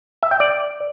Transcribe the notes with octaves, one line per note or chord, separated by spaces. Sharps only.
E5
G5
D5